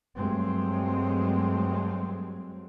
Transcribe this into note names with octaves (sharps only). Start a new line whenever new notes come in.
G2 F#3 G#3 A3 C4